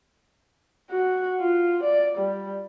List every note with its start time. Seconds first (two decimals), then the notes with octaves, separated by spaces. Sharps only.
0.90 F#4
1.40 F4
1.83 D5
2.18 G3